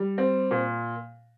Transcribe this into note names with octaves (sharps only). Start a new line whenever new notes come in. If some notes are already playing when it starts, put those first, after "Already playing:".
Already playing: G3
C4
A#2